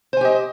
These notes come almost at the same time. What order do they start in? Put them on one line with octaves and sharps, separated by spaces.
C5 G#5 G4 D#5